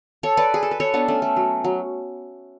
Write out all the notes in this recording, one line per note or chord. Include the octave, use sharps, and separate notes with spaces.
A4 C#5
B4 D5
G#4
A4
B4
A4 C#5
B3 D4
A3 C#4
A3
F#3
F#3